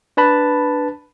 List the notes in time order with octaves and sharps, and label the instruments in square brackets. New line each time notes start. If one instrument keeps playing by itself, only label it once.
[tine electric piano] D4 B4 A5 B5